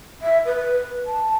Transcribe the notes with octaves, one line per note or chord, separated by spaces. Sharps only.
E5
B4
A5